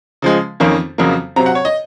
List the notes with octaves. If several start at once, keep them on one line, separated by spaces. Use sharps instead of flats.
C#3 F3 G#3
F2 D#3 A#3 C#4
F2 C#3 F#3 A#3
C3 F#3 C4 A#5
F#5
C#5
D#5